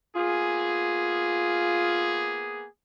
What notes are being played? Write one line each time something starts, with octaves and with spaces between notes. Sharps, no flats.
A#3 B3 F4 G#4